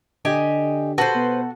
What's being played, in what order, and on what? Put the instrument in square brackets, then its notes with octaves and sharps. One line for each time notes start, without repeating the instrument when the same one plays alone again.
[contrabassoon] D3 [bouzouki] G4 D#5 G#5
[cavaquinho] F#4 A4 [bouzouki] B4 C5
[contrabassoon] B2